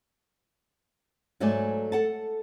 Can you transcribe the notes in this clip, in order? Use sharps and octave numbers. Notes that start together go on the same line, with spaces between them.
G#2 F#3 A3 A4 D5 G#5
A4 F#5 A5